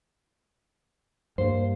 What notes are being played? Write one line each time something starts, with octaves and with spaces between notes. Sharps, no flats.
G2 G3 A#3 C5